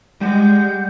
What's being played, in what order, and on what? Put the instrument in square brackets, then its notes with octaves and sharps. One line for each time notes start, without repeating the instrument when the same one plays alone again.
[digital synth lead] G3 [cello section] G#3 [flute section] F#5 G6